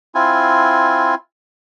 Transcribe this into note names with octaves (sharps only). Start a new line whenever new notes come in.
C4 E4 F4 G#5